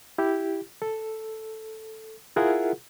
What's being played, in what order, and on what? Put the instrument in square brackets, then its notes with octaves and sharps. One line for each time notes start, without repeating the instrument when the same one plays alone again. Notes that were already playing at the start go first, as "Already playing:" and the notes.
[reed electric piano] E4 G4
A4
E4 F4 G#4 A#4 E5 F#5